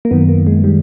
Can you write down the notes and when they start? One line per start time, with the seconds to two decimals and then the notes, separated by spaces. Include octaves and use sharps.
0.05 A#3
0.11 F#2 D#3 B3
0.28 A#3
0.47 G#3
0.64 D#3 G3